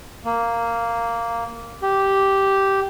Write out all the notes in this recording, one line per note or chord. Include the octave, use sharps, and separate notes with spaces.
A#3
G4